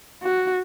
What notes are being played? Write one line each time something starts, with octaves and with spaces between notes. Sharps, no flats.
F#4